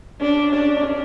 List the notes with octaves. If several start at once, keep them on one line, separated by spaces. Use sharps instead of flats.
C#4 D4
C#4 D4
C#4